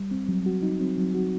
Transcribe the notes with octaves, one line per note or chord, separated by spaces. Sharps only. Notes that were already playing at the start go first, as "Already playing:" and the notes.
Already playing: G3
C4
F#3
F#4
D#4
C4
F#3
F#4